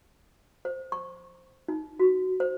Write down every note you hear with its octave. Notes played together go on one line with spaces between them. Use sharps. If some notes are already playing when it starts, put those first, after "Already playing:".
C5
C#6
D#4
F#4
C5